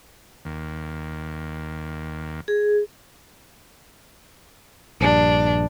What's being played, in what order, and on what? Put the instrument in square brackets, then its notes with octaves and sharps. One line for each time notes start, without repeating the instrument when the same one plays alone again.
[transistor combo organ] D#2
[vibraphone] G#4
[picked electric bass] A#1 G2 [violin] D4